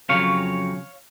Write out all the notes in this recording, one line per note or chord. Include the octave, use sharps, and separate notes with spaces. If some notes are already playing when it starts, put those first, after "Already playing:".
F2 C#3 F#3 C#5 F5